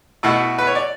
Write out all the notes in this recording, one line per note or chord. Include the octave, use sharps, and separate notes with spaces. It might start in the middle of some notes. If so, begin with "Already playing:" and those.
B2 A3 E4 F#5
B4
C#5
D5